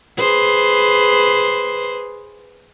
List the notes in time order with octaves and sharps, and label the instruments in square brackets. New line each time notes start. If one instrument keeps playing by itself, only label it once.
[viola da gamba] G#4 B4 C5